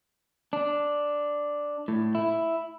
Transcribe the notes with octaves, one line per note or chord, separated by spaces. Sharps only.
D4
A2
E4